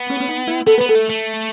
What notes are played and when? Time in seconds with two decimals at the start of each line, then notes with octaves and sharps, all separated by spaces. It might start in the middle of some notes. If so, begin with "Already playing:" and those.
Already playing: B3
0.10 C#4
0.20 C#4
0.28 D#4
0.47 E4
0.66 B3 A4
0.78 B3 B4
0.89 A4
0.95 A3
1.10 A3